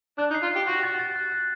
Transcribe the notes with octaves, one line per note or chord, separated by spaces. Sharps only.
D4 F#6
D#4
C7
F4
C7
G4
F#4 F#6
A6
A6
F#6
F#6